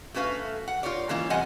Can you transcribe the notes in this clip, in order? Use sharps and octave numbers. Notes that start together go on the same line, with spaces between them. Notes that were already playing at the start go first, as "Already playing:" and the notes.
A3 C#4 F#4 B4 F5
F#5
F4 G4 A#4 C#5 D5
G#2 E3 A#3 C#4 F4
E2 C3 G3 D#5 F#5 G#5